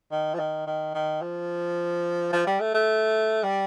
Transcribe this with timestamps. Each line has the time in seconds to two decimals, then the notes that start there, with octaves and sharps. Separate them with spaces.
0.11 D#3
0.34 F3
0.39 D#3
0.67 D#3
0.94 D#3
1.22 F3
2.33 F3
2.46 G3
2.60 A3
2.74 A3
3.43 G3